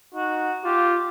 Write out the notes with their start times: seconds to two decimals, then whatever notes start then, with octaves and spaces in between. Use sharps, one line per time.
0.14 D#4 F#4
0.65 F4 G4